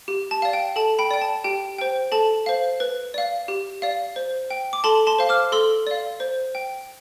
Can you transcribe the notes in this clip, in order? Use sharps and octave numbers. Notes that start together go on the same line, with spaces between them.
G4
A5
D5 F5
G5
A4 A5
G5 B5
D5 G5
A5
G4 G5
C5 G5
A4 A5
C5 F5
B4
D5 F5
G4
D5 F5
C5
G5
D6
A4 A5 C6
A5 C6
C5 F5
D6 F6
A4 C6 E6
D5 F5
C5
G5